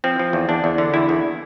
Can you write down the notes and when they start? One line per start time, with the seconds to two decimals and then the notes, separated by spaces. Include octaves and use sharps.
0.04 F3 C4
0.19 F3
0.33 E2
0.49 E2 D4
0.64 E2
0.78 D3
0.94 E2 E4
1.09 E2